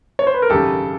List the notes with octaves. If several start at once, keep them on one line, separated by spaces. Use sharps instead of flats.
C#5
C5
B4
A#4
G#1 F#2 C#3 G4 A4